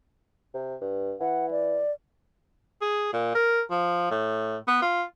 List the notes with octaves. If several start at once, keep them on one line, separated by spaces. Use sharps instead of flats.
C3
G2
E3 F#5
D5
G#4
A#2
A#4
F3
A2
B3
F4